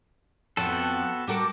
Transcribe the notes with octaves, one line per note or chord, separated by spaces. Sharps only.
F2 F3 B3 F#4 A4 G5 A5
G3 F#4 G4 A4 A#4 D5